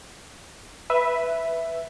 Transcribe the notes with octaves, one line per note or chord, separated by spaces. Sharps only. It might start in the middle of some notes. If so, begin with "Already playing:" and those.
B4 E5